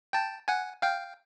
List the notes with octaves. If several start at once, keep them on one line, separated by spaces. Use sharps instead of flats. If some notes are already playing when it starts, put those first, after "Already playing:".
G5 A5
F#5 G#5
F5 G5